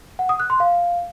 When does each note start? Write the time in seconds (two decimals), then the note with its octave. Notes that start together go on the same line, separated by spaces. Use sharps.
0.19 F#5
0.29 D#6
0.40 F#6
0.50 C6
0.60 F5